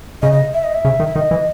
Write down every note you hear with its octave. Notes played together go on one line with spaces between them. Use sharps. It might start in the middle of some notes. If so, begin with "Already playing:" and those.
C#3 D#5
D#5
E5
D#5
E5
C#3
D#3
E5
D#3 D#5
E3